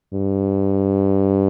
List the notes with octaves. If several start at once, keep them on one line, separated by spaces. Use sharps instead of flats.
G2